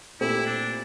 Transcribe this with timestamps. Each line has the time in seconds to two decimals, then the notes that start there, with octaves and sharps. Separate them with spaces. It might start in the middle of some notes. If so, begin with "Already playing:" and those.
0.21 A#2 A3 C4 E4 G4
0.46 D4